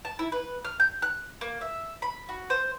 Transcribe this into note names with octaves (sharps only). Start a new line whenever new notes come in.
A5
E4
B4
F6
G6
F#6
A#3
E5
B5
F#4
C5